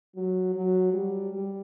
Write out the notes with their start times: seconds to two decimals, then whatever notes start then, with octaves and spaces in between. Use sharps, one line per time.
0.16 F#3
0.55 F#3
0.93 G3
1.33 G3